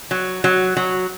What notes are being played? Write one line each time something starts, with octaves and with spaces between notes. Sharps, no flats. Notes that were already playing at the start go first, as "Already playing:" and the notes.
F#3
F#3
F#3